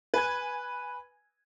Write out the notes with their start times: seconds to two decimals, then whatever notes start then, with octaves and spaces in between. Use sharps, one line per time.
0.14 B4 G#5 G#6